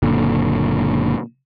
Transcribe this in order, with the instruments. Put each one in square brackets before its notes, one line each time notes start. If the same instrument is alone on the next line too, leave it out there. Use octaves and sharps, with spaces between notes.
[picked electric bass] F#1 A#2 D3